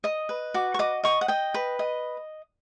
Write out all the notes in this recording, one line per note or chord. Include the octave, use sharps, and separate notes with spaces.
D#5 D#6
B4
F#4 D6
C#6
D#5 D6
D#5 C#6
F#5
D#5 G5
B4
D#5